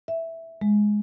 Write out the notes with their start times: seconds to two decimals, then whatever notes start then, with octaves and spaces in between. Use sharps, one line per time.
0.08 E5
0.61 G#3